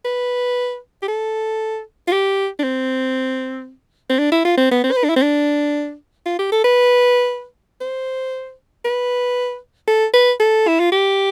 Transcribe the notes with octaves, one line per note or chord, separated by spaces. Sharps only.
B4
G4
A4
F4
G4
D4
C4
C4
D4
E4
F4
C4
B3
C4
C5
B4
D4
E4
C4
D4
F4
G4
A4
B4
C5
B4
A4
B4
A4
E4
F4
G4